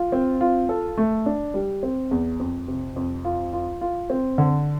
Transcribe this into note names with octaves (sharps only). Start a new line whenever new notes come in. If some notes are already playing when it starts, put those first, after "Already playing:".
Already playing: F4
C4
F4
A4
A3
D4
G3
C4
E2
F2
C3
F2
F4
F4
F4
C4
D3